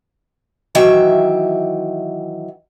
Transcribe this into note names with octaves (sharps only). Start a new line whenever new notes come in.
D#3 E3 F#3 E5 G5